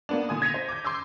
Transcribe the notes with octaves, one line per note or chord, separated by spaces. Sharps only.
A#3 B3 D4
A#2 D3 G#5 D#6
G#6 A#6 B6 C#7 D#7 F7
C5
D6 G6
C6 D6 E6 G6